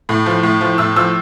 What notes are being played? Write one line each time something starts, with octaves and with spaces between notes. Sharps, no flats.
A2
F3
A2
F3
A2 E6
F3 E6